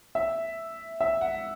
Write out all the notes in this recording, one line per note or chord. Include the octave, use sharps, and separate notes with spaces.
E5
E5
F#5